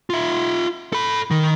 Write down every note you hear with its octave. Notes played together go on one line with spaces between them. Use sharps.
F4 E5
A4 B5
D#3